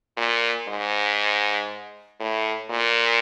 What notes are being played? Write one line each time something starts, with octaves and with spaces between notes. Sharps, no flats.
A#2
G#2
A2
A#2